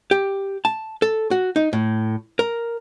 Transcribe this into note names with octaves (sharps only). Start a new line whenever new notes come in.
G4
A5
A4
F#4
D#4
A2
A#4